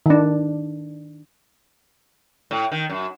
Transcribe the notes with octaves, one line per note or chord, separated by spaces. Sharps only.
D#3 D4
A2
D#3
F#2